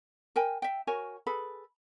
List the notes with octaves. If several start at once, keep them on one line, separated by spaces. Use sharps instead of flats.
A#4 G5 G#5
E5 G5
F#4 A#4 C#5 G#5
G#4 A4 B4 B5